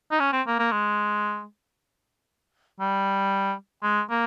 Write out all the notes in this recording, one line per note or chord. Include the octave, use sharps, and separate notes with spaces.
D#4
C#4
C4
A#3
A#3
G#3
G3
G#3
A#3